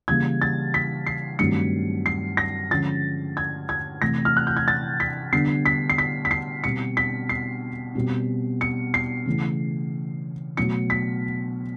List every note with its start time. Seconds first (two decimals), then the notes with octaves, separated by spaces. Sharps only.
0.08 C#3 E3 G3 A#3 G#6
0.42 A6
0.74 B6
1.07 C7
1.39 G2 D#3 F#3 A3 C4 C#7
2.06 C7
2.37 A#6
2.70 D3 F3 G#3 C#4 A6
3.37 G#6
3.69 G#6
4.02 C3 E3 A3 A#6
4.25 F6
4.37 F#6
4.47 G6
4.57 G#6
4.68 A6
5.00 B6
5.32 D3 G3 B3 D4 C7
5.66 B6
5.90 C7
5.98 B6
6.25 B6
6.31 C7
6.64 B2 G3 C4 C#7
6.97 B6
7.29 C7
7.95 B2 G3 C4
8.61 C#7
8.94 C7
9.26 C#3 E3 A3
10.57 B2 F#3 A3 C#7
10.90 B6